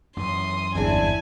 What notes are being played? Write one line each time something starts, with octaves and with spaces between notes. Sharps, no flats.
F#2 E3 C6 D#6
G1 E2 C4 D4 E4 G#4 G#5